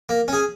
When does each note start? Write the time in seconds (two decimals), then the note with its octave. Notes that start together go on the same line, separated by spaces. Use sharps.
0.09 A#3
0.28 C#4 G#4